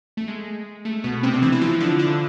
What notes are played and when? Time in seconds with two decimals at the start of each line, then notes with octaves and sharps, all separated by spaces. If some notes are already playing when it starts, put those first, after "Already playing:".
0.17 A3
0.28 G#3
0.85 A3
1.04 B2 B3
1.23 C3 C4
1.34 D4
1.42 E3 E4
1.52 E4
1.61 F3 F4
1.80 D3 D4
1.99 D3 D4